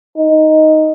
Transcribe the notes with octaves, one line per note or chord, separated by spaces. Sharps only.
D#4